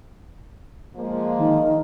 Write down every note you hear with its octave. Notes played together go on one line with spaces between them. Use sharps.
F3 G#3 A#3
D#3